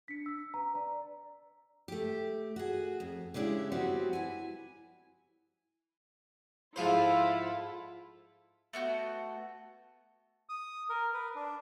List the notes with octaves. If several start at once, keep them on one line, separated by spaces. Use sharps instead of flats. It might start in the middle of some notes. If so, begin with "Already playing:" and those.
D4 B6 C#7
E6 B6
B4 A#5
D5 A#5
A3 G4
F#4 G#4
F2
C#3 G#3 D4 E4 G4
F#3 G3 B3 C4 F#4 G4
E4 G#5
G#2 F3 E4 F4 A4 C5
A3 B3 F#4 G6
D#6
A#4
B4
D4